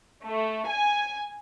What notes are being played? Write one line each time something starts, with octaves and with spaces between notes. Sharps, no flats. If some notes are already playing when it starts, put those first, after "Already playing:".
A3
G#5